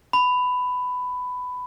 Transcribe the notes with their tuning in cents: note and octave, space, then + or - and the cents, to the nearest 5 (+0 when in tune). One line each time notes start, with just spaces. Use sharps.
B5 +15